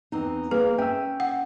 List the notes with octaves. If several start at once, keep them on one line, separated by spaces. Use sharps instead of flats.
E2 C4 D#4
A#3 G#4 B4
C#4 E5 G5 G#5 E6
F#5